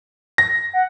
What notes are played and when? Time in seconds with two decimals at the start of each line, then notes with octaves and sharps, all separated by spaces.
0.38 A#6
0.73 F#5